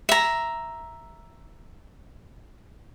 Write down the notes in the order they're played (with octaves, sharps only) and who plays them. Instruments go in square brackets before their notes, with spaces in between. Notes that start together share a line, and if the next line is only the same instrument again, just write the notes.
[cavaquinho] E5 A#5